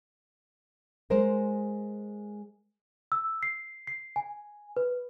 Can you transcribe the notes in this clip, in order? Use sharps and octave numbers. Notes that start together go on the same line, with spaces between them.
G#3 A#4 C5
E6
C7
C7
G#5
B4